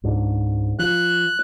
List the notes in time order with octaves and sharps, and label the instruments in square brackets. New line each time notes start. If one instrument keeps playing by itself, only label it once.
[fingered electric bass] C#2 G#2 D4
[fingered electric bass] F3 [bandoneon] F#6